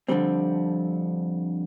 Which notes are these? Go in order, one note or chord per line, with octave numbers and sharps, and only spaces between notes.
F2 D3 G3 C4